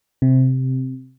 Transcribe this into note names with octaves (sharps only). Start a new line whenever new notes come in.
C3